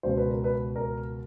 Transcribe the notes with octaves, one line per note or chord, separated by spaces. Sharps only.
C#2 B2 C5
B4
A#4
B4
A#4